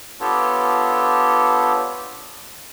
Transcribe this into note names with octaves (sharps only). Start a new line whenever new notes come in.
B3 D4 F4 G4 A4 C#5